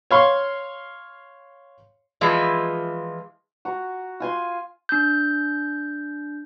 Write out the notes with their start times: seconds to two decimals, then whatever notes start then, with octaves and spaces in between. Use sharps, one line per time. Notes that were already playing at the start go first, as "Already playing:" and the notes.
0.11 C#5 F5 C6 C#6
2.21 E3 F3 G#3 E4 F4
3.65 F#4 A#5
4.20 F4 G#5 C6
4.89 D4 G6